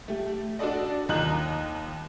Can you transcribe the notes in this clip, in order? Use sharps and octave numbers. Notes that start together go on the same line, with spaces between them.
A3 G4
D4 F#4 A4 D5 D#5
D#2 D#5 A#5 F#6 F#7